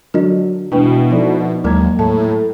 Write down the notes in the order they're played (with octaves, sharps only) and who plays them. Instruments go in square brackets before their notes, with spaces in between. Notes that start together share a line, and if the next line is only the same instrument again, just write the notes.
[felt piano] D3 F#3 D4 [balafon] A#4 D#5
[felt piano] E1 G5 [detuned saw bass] B2 [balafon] D4 B4 [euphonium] E4
[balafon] F3 [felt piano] D#4 A4 D5
[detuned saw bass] D#2 [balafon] F#3 G#3 A#4 [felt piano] A#3 A#5 G#6
[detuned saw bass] A2 [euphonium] A4 [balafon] A5